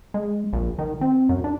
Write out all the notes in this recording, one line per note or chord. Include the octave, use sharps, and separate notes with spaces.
G#3
A#1
D#3
C4
F#2
D4